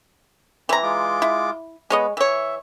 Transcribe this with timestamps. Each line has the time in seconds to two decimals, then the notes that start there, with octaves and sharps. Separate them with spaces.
0.69 E3 C4 A#5
0.83 G#3 F4 D6
1.22 E4
1.90 G#3 B3 C#5 D#5
2.17 E3 C#5 E5